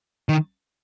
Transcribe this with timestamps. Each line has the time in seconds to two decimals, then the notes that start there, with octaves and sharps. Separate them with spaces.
0.29 D#3